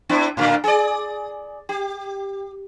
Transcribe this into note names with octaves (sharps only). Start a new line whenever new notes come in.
B3 D4 E4
A2 D3 A#4
G#4 D5
G4